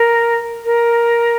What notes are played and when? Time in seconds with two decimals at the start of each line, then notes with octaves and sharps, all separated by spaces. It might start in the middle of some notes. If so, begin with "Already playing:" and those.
Already playing: A#4
0.64 A#4